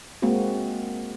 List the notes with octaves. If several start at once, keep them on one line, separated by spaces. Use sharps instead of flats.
G#3 A#3 C4 F#4